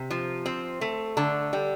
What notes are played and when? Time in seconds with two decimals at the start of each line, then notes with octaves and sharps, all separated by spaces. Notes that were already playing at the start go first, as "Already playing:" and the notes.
Already playing: C3
0.10 F3
0.46 C4
0.81 A3
1.17 D3 A5
1.53 G3